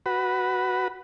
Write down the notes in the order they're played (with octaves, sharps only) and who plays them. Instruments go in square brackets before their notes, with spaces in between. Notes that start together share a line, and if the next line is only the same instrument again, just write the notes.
[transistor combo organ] F#4 B4